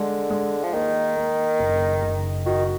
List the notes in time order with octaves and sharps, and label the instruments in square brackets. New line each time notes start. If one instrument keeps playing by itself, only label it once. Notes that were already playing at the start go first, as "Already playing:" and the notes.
Already playing: [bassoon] D3 [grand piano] G#3
[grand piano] G#3
[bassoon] F3
[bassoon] D#3 [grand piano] A#3
[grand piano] A#3
F#1
F#1
[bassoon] D#3 [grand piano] F#4